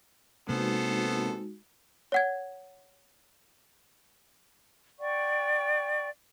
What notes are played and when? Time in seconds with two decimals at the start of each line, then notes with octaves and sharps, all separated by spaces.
0.49 C3 G#3 A#3 B3 D#4 F#4 A4 C5
2.12 C#5 F#5 G#6
4.99 D5 F#5 G5 C#6